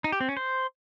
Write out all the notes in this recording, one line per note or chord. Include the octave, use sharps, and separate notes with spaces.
D#4
G4
C4
C#4
C5